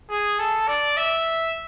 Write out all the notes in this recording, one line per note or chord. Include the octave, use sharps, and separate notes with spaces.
G#4
A4
D5
E5